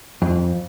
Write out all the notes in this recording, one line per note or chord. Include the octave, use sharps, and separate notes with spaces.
F2